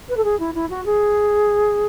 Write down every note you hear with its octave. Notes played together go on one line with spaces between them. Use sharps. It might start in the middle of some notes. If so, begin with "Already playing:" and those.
B4
A4
G#4
E4
E4
F#4
G#4